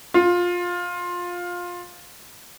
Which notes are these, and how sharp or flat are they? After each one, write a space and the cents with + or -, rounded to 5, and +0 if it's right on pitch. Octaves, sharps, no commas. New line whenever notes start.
F4 +15